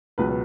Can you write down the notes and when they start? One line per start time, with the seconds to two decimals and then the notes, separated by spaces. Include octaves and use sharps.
0.18 C#2 B2 F#3 B4
0.29 B4